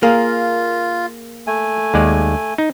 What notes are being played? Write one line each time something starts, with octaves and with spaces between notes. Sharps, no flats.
A#3 F4 G#4 A#4
A3 G#5
D#2 G#3 D5
D#4